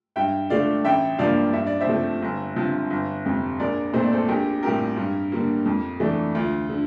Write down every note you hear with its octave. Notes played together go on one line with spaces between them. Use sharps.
G2 E5 G5
D3 A3 D4 D5 F5
A1 E5 G5
G2 F3 A#3 D4 D5 F5
G2 E5
D5
C5 E5
F3 A3 C4
G1
G2 F3 C4
G1
F2 C3
A#1 A#4 D5
A#2 A3 C4 C5
D5
A4 C5
A#1 G4 A#4
A2 G3 C4 G4 A#4
G2
D3 G3 A#3
F2
E3 A3 D4
D2 F4
D3